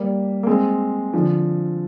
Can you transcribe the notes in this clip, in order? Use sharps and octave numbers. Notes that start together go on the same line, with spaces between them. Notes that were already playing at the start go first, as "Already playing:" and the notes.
Already playing: G3 A#3
A#3
G#3 C4
D3 F3